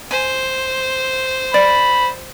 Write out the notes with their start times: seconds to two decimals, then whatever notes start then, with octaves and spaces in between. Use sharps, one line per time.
0.11 C5 G#5
1.54 D5 B5